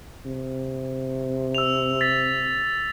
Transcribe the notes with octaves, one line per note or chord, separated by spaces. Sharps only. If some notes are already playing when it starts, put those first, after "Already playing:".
C3
E6 F7
A6 B6